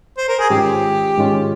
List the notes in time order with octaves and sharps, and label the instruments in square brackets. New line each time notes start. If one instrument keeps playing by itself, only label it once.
[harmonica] C5
A#4
G#4
[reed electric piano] G#2 D#3 G#3 C#4 F4 [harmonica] G4
[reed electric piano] G#2 D#3 G#3 C#4 F4